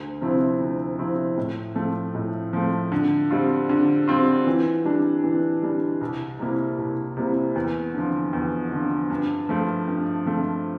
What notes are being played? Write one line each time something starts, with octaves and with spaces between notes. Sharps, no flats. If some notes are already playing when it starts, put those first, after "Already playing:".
Already playing: D2
C3 F3 C4 E4
D2
C3 F3 C4 E4
A2
F3 A3
A2
F3 A3
D3
G3 C4 F4
D3
G3 C4 F4
E3
G3 D4
E3
G3 D4
C2
C3 G3 A#3 E4
C2
C3 G3 A#3 E4
E2
D3 F3
E2
D3 F3
G2
F3 A3
G2
F3 A3